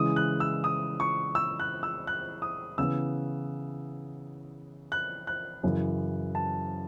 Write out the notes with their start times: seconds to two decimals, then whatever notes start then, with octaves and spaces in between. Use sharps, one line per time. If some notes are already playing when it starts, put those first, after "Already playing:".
Already playing: C#3 E3 G#3 D#6
0.16 F#6
0.40 E6
0.64 D#6
1.00 C#6
1.35 E6
1.60 F#6
1.83 E6
2.07 F#6
2.42 D#6
2.78 C#3 E3 B3 E6
4.92 F#6
5.27 F#6
5.63 F#2 C#3 E3
6.35 A5